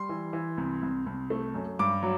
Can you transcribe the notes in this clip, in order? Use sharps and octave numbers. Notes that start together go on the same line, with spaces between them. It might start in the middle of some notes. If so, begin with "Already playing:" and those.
Already playing: G3 C6
E3
E3
C2
C2
C2
A3
F#2
G2 D6
F#3